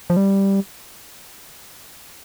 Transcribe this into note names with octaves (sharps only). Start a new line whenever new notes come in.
F3
G3